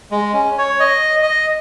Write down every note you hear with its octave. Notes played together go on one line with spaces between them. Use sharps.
G#3
C#4
C#5
D#5
D#5